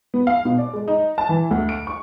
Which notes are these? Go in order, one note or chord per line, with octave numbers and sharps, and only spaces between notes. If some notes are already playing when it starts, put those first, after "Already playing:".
B3
F5
B2
D5
G#3
D#4
A5
E3
D2
D7
C#6